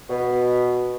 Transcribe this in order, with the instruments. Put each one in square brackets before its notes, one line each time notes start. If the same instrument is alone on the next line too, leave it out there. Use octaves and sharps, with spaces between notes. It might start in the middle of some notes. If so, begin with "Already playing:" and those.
[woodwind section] B2